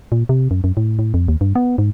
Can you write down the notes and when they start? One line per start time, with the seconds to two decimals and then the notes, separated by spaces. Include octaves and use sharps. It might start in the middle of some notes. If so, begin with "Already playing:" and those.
0.12 A#2
0.29 C3
0.51 F#2
0.64 F#2
0.77 A2
0.99 A2
1.14 F2
1.28 D#2
1.41 G2
1.55 B3
1.78 G#2